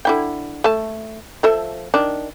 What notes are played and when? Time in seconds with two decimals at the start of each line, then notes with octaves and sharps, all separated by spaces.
0.05 D3 E4 G5
0.64 A3 A5
1.43 F3 A4 E5
1.94 D#3 D4